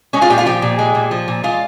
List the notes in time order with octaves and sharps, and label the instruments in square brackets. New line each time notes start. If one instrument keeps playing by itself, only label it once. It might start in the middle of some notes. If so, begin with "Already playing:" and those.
[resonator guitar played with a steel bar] G#3 C#4 C#5
F4 F5
A#2 G4 G5
F4 F5
F3 G4 G5
A#2
G#3
A#2
F3
A#2
G#3 F4 F5